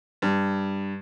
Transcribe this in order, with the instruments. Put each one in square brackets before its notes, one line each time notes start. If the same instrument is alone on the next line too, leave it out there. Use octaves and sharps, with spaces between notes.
[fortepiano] G2